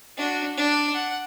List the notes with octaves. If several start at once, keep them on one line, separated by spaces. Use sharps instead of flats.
D4 F#4
D4
F#5